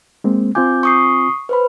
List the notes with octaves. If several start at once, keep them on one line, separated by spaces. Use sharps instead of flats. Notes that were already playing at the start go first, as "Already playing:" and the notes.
G#3 A#3 C4
C4 F4 G#5 D6 G6
C#6 D#6 C7
B4 C5 B5